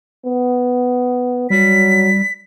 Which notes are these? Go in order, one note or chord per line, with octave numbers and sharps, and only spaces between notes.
B3
F#3 G3 B6